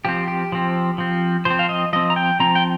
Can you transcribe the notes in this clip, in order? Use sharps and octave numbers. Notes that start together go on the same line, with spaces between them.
F3 C4 G4
G4
F3 C4
F3 C4
F3 C4 C5
F5
D#5
F3 C4 D#5
A#5
G5
F3 C4 A#5
G5